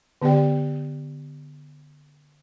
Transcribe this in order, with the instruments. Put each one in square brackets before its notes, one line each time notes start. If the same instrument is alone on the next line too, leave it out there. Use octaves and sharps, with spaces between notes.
[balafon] D3 B3 G4 D5 G5